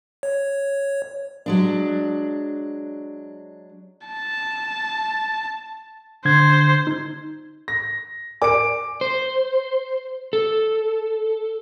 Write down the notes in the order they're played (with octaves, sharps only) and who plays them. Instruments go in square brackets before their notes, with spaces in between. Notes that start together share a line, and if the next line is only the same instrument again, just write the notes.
[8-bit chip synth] C#5
[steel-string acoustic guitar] F#3 G#3 D4
[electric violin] A5
[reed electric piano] D3 G#6 [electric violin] C5
[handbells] D#4 G#6
[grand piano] A#6
[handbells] A#4 D5 G#5 [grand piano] D6 D7
[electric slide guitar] C5
A4